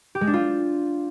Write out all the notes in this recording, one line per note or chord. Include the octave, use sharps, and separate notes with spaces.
G4
G#3
D4
F4